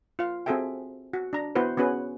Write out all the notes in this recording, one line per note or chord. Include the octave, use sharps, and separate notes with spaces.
F4 F5
C4 F#4 G#4 A4 E5 G5
F#4
D4 A#5
B3 E4 F#4 B4 C5
B3 C#4 F#4 G#4 B4